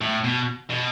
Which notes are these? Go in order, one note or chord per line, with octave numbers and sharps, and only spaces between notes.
A2
B2
B2